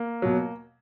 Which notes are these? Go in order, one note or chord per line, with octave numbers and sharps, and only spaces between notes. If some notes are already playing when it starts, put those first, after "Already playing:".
Already playing: A#3
B2 F#3